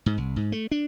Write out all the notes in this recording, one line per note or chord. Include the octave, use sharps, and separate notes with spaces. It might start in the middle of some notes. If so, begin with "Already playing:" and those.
G#2
C2
G#2
A3
D4